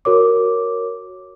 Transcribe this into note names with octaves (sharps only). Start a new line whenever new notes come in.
F#4 A#4 C#5 D6